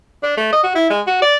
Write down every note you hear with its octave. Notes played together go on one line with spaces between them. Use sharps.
D4
A3
D#5
F#4
E4
G#3
F#4
D5